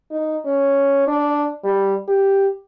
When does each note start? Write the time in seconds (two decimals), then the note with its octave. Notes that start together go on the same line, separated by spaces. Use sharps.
0.11 D#4
0.46 C#4
1.08 D4
1.64 G3
2.08 G4